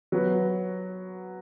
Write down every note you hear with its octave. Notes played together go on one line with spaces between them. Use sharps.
F#3 B3 F#4 B4